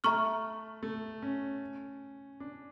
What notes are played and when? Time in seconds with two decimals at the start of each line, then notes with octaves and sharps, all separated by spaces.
0.04 A3 E5 A#5 C#6 F6
0.83 A3
1.22 C#4
2.40 D4